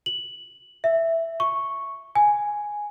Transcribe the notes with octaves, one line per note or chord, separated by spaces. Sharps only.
F#7
E5
C#6
G#5